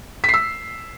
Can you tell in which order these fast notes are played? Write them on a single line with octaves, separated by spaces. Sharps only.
B6 C7 E6